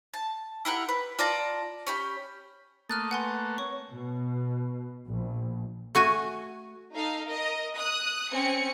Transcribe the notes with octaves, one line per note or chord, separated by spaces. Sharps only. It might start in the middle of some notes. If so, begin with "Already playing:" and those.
A5
E4 G4 A#4 F#5
B4
F4 D5 A5 A#5
C#4 G4 B5
A3 A#3 D#6 F6 F#6 A6
B4 F#5 G#5 C6
C4 C#5 C#6
B2
A#1
A3 F#4 G#5
D#4 A4 F5
A#4 D#5
D#6 F#6
C4 C#4 G#5 C#7